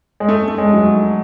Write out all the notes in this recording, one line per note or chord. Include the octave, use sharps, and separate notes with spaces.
G#3
A3
A3
G#3
F#3